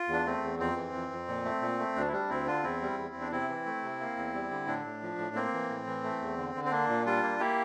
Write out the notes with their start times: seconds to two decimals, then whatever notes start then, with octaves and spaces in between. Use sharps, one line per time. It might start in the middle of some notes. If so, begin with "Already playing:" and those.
Already playing: F4
0.08 E2
0.13 D4
0.26 A3 C4
0.43 E2
0.59 F2 C4
0.76 E3
0.93 F2
1.11 F2
1.28 A#2
1.45 A3
1.62 A#2
1.79 A3
1.96 D2 D4
2.08 E4
2.13 G3 D4
2.29 D2 C4 E4
2.47 D3 D4 F4
2.63 E2 C4 E4
2.81 G3
2.98 E2
3.15 E2
3.21 D4
3.32 C3 C4 E4
3.48 E3
3.66 A3
3.83 C3
4.00 A#3
4.17 E2
4.34 G3
4.51 D3
4.67 A2 D4
4.84 A2
5.02 F3
5.18 A2
5.35 A#3 C4
5.53 E3
5.69 A2
5.86 E3
6.04 A3
6.21 E2
6.38 D3
6.55 D3
6.65 C4
6.71 A#3 D4
6.89 A#2
7.05 G3 D4 F4
7.23 A#3
7.40 A#3 E4 G4